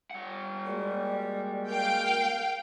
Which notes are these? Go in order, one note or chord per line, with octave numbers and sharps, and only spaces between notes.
G3 F#5
G#3 A#3 F#4 D5
A#4 F5 G5